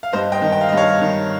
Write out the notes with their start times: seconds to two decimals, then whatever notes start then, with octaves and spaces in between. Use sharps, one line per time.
0.03 F5
0.13 G2 C5 D#5
0.32 D#5 G5
0.42 D#3
0.52 G5
0.61 F5
0.69 D#5
0.72 G2
0.77 C#5 F5
1.01 D#3